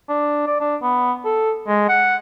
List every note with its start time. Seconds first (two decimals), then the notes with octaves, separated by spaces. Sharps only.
0.09 D4
0.47 D5
0.60 D4
0.82 B3
1.25 A4
1.67 G#3
1.89 F#5